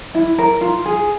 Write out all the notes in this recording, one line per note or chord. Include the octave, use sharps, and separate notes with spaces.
E4
A#4
F4
G#4